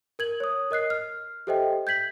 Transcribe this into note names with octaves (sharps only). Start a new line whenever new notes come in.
A#4 G#6 F#7
C#5 D#6
A#4 D#5 F#6 C7
F6
G4 A4 C5 D#5 E5 G5
G6 G#6 B6 F#7